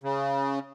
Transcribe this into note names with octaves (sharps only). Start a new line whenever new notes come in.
C#3